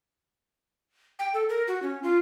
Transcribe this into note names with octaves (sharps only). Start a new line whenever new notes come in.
G5
A4
A#4
F#4
C#4
F4